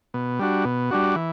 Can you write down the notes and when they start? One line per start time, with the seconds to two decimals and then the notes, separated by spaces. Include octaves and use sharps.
0.14 B2
0.39 G3 D4 F#4
0.65 B2
0.91 G3 D4 F#4
1.16 E3